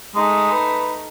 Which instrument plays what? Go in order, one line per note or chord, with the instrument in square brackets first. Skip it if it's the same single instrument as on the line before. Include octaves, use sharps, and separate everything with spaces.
[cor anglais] G#3 [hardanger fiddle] A3 D#4
[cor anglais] B4